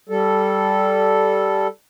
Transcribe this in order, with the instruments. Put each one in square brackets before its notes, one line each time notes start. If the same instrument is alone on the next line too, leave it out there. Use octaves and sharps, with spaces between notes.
[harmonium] G3 A4